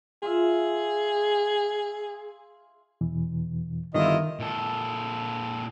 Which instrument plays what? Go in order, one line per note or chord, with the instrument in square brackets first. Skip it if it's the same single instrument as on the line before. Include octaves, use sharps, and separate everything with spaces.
[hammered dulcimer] F4 E5 [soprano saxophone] G#4
[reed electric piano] E2 B2 E3
[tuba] G1 [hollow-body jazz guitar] D#3 [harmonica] E4 F4 D#5
[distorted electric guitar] A#2 A4